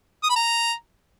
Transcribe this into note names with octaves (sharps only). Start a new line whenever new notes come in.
D#6
B5
A#5